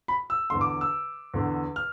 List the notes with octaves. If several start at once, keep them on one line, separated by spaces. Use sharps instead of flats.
B5
E6
E2 D3 C6
D6
E6
E2 D3
F6